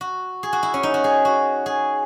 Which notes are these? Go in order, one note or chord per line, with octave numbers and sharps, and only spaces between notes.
F#4
G#4
F#4
E4
C#4
D#4
F#4
G#4
F#4
G#4